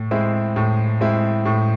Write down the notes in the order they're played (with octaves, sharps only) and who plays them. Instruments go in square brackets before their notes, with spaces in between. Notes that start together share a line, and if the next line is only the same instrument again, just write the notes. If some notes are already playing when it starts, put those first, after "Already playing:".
Already playing: [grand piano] A2
G#3 C4 E4
A2
G#3 C4 E4
A2